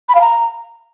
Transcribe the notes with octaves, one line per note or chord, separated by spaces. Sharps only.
B5
F5
A#5